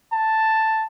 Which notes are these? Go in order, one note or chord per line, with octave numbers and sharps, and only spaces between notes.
A5